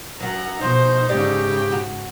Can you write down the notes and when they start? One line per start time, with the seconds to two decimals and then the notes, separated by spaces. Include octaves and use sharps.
0.20 F#2 F#3 F#5 A#5
0.61 B2 F3 D#4 C5
1.09 G#2 C#3 G4 D5
1.72 F#4